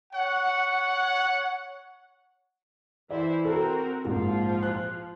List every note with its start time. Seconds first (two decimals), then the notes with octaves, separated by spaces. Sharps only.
0.13 C#5 F#5
3.10 E3 E4 C5 D5
3.45 C4 F#4 A4 A#4
4.05 A#1 G#2 F3 F4
4.63 F#6